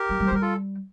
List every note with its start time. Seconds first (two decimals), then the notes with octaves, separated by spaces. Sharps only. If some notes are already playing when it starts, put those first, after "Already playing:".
Already playing: G4 A#4
0.09 G3
0.20 G3
0.27 C5
0.31 G3 A#4
0.42 F4 A4